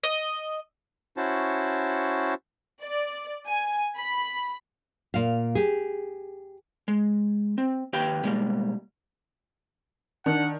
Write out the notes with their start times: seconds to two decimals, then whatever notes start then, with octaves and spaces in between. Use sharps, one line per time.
0.03 D#5
1.17 C#4 E4 F#4 C5 A5
2.81 D5
3.47 G#5
3.96 B5
5.14 A#2 F5
5.55 G4 G#4
6.88 G#3
7.58 C4
7.93 D#2 G4 B4 F5 G5
8.23 B2 G3 G#3 A#3
10.26 D#3 D4 F#5